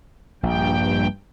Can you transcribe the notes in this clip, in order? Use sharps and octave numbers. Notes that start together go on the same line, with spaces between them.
A#1 G2 G5